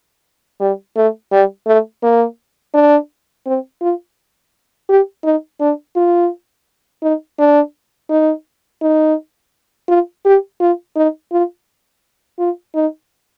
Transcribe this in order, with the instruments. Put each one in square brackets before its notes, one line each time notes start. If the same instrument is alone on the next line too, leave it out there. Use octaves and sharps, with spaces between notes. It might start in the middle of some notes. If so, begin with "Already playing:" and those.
[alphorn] G3
A3
G3
A3
A#3
D4
C4
F4
G4
D#4
D4
F4
D#4
D4
D#4
D#4
F4
G4
F4
D#4
F4
F4
D#4